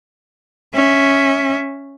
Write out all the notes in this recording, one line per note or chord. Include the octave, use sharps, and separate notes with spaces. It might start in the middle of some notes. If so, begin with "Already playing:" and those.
C#4 E5